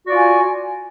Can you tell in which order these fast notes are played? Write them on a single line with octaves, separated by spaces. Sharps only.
F#4 D5 F4 G#5